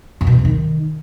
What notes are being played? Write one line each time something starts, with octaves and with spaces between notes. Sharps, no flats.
F#2
B2
E3
C3
D#3